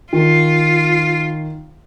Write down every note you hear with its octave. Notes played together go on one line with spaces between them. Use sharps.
D#3 F4